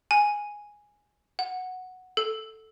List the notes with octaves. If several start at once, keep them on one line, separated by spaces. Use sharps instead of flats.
G#5
F#5
A4